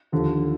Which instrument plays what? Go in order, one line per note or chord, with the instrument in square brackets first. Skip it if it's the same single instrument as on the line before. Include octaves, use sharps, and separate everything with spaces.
[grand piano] D#2 D3 F3